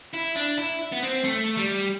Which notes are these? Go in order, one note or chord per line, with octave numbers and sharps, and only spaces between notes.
E4
D4
E4
B3
C4
A3
G3